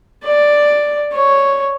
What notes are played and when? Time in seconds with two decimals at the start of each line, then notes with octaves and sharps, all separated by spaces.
0.25 D5
1.15 C#5